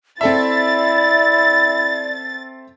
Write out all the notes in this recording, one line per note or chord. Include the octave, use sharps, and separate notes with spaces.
C4 E4 A4 D5 E5 A6